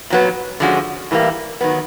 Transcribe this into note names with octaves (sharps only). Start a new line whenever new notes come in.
A#2 F#3 B3
D3 F3 G#3 C#4 F#4
A2 E3 G3 A#3
D#3 F#3 B3